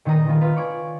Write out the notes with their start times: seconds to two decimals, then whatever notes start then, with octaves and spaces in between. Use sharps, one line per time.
0.05 A#2 D#3 B3 D#5 A#5 D#7
0.28 D#3 A#3 B3 F4
0.41 F4 B4 C5
0.56 C#5 D5 G#5